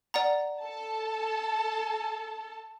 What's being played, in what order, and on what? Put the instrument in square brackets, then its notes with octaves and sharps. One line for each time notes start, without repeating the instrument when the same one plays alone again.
[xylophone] D5 F#5 A#5
[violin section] A4 A5